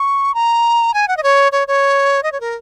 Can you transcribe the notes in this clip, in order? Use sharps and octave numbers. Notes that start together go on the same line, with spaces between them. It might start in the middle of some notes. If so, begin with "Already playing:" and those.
Already playing: C#6
A#5
G#5
F#5
D#5
C#5
C#5
C#5
D#5
C#5
A#4